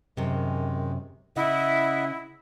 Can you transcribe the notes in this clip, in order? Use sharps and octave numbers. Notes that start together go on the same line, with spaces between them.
F#2 C3 D#3 G#3
C#3 E4 D#5 E5 F#5